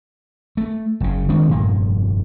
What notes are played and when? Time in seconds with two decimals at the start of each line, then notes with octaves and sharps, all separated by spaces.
0.57 A3
1.00 F#1 C#3
1.28 D#3 G#3 C4 D4
1.49 F1 G2 A#2 A#3